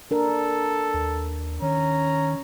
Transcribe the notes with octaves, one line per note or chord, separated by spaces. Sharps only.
D4 A4 A#4
D#2
D#3 C#4 A#5